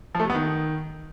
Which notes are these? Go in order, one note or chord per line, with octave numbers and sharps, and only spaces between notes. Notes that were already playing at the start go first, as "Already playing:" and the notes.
F3
A3
C3
B3
D#3